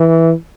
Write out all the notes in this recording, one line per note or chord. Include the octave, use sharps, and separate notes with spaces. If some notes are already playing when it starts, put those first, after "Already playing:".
Already playing: E3